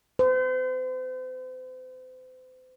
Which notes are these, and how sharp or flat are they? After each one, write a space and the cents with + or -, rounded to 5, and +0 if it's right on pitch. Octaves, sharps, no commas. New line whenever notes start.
C5 -40